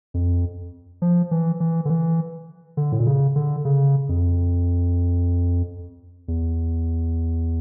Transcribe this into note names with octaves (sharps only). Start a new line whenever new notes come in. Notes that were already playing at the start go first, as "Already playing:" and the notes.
F2
F3
E3
E3
D3
E3
D3
A2
A#2
C#3
D3
C#3
F2
E2